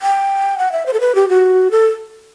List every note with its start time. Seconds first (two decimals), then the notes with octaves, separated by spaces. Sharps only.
0.02 G5
0.58 F#5
0.72 E5
0.86 C5
0.93 A4
1.00 B4
1.15 G4
1.29 F#4
1.71 A4